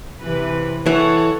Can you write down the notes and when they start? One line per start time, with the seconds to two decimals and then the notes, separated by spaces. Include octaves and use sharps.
0.20 C3 E3 B4
0.86 E3 A4 C#5 F#5